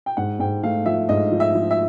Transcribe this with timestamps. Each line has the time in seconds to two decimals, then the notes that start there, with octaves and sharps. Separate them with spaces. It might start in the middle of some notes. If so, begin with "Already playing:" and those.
0.06 G5
0.17 G#2 F#5
0.39 G#2 G5
0.63 A3 F5
0.86 F3 E5
1.09 G#2 D#5
1.32 F3
1.40 E5
1.55 F3
1.71 E5